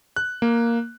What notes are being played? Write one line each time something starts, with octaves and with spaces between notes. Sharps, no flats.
F#6
A#3